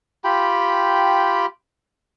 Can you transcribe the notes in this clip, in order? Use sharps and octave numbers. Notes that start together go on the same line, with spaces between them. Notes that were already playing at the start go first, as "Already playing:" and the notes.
F4 G4 G5 B5